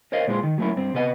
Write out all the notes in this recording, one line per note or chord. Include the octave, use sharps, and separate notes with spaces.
A#4 C5 C#5 D#5 F5
A#2 G#3 F4 C5
D#3
F#3 A3 A#3 C#4 E4
G2 C4
C3 B3 B4 D#5 F5 F#5